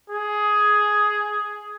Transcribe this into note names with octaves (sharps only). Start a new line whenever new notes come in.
G#4